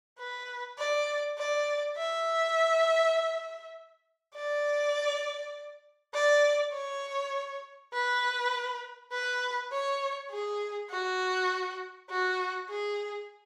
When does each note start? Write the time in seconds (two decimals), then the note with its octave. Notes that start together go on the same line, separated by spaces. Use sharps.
0.19 B4
0.78 D5
1.38 D5
1.97 E5
4.35 D5
6.14 D5
6.74 C#5
7.93 B4
9.12 B4
9.72 C#5
10.31 G#4
10.90 F#4
12.10 F#4
12.69 G#4